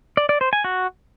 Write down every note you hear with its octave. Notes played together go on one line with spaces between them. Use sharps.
D5
D5
C5
G#5
F#4